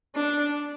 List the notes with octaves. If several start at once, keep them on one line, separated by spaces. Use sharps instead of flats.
D4